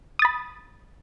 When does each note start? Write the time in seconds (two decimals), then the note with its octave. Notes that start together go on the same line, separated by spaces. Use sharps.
0.19 D#6
0.22 A6
0.25 B5